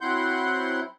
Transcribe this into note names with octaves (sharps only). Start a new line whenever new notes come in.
F#3 C4 E4 F#5 C6 G6